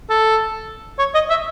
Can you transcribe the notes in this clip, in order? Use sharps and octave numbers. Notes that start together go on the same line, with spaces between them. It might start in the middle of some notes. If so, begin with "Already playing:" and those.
A4
C#5
D#5
E5